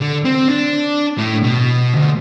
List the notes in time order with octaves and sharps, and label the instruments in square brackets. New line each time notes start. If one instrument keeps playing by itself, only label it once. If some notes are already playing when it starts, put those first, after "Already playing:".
[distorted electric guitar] D3
C4
D4
A2
B2
D2